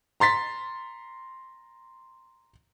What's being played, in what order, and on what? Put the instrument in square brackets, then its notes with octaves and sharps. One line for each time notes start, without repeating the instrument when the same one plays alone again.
[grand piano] A#5 C6 A6 B6